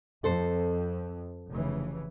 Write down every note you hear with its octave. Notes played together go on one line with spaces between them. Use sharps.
F2 A4 C5
F1 C#3 E3